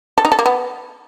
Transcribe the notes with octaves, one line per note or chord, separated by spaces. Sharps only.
A4
D#4
A4
A#3
B3